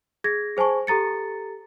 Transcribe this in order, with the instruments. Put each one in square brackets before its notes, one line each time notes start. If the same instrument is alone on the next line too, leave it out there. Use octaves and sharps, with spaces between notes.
[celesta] G#4 G#6 A#6
G#4 C5 G#5 A5 C#6
G4 A4 A#5 A6 C#7